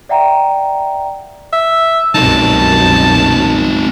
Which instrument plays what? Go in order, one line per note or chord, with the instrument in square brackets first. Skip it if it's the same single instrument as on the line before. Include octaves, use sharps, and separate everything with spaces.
[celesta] D5 E5 F#5 G5 A#5
[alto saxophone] E5
[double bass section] C2 F#2 B2 [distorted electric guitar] C4 D#4 [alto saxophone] A5